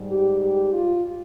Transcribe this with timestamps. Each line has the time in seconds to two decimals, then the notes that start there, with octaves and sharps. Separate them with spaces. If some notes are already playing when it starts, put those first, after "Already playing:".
Already playing: G#2 G3
0.10 G4
0.42 G4
0.74 F4